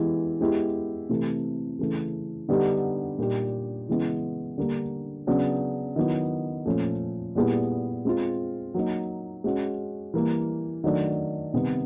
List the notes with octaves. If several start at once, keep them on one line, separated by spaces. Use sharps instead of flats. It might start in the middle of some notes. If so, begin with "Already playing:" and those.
Already playing: E3 G#3 B3 E4 G4
G#3 B3 E4 G4
C3 E3 A3
C#3 E3 A3
D3 G3 B3 D#4 G4
A#2 G3 A#3 D#4 G4
C#3 E3 G#3 B3 E4
D3 G3 A#3
C#3 F#3 B3 D4
D#3 F#3 B3 E4
A#2 F3 A3 C#4
A#2 G3 B3 E4 G#4
G#3 C4 F4
F#3 A#3 D#4
G#3 C#4 F#4
E3 G3 A#3
D#3 F#3 A3 D4
C3 D#3 G3 B3